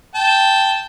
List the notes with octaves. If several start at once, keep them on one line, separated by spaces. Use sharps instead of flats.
G5 A5